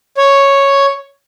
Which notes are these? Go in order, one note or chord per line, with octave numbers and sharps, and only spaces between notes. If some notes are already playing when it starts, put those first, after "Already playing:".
C#5